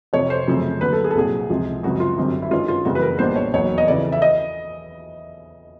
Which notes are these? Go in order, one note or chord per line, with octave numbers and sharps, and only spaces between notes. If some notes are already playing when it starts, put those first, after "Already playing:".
F1 F2 C3 C#5
C5
F#2 C#3 F3 A3 C4
D#2 D3 F#3 B4
A4
G#4
A4
C2 A#2 F#3 G#4
C#2 C3 F3 G#3
F#2 C#3 F3 G#3 C4 F#4
F4
G#1 F#2 D3 G3 C4
E4
G2 D#3 G#3 C#4 F4
F4
F#1 F2 C#3 E3 G3 F#4
B4
A#4
B1 A#2 G3 B3 D4 C5
C#5
E1 D#2 D#3 F#3 B3 C#5
D#5
F2 C#3 E3 D5
E5
D#5